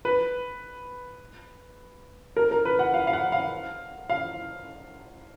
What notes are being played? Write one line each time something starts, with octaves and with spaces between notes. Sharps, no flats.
B4
A#4
A#4
B4
F#5
F5
F5
F#5
F5
F5